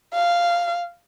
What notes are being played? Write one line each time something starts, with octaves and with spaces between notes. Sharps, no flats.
F5